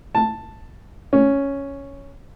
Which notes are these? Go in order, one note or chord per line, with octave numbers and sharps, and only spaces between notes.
A5
C#4